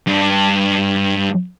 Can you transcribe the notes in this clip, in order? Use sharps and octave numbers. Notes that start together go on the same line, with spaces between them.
G2